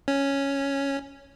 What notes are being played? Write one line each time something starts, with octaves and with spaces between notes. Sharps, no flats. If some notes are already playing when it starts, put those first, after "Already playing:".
C#4